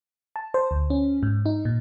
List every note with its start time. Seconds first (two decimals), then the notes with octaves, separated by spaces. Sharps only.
0.36 A5
0.54 C5
0.71 D2
0.90 C#4
1.23 G#2
1.46 D#4
1.65 A#2